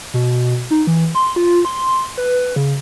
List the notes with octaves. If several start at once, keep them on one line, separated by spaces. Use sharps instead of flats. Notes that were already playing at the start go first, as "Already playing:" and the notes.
B2
D#4
E3
C6
F4
C6
B4
C#3